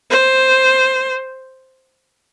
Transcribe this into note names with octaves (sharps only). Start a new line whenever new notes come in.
C5